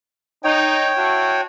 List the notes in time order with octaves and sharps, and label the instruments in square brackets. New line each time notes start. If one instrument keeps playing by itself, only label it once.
[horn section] D#4 [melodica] C#5 G5
[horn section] D4 E4 F#4